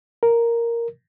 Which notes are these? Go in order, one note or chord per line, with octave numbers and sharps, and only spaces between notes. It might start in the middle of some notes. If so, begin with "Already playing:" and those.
A#4